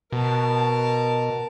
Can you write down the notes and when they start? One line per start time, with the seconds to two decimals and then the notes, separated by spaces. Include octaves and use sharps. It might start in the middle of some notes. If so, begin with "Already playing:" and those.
0.12 B2 A#4 A5